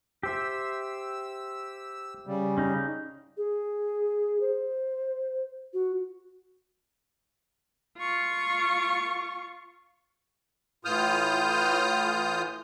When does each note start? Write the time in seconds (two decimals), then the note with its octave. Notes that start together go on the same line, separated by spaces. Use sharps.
0.23 G4 C5 E5 E6
2.27 C#3 G3
2.58 C#4 D#4
3.37 G#4
4.41 C5
5.74 F#4
7.98 F4 C#6
10.85 A2 E3 F4 D#6 F6 G6